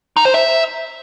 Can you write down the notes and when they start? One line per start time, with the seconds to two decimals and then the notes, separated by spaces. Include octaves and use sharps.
0.17 D#4
0.25 C5
0.34 E5